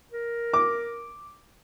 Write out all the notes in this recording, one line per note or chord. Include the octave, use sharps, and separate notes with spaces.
A#4
D6